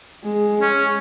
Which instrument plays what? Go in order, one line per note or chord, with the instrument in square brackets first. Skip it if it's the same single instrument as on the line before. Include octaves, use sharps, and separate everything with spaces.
[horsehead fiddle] G#3
[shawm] C#4